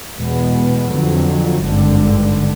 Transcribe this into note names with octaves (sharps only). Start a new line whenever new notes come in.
E2 B2 G#3 B3
F2 D3 F#3
G#1 G2 D3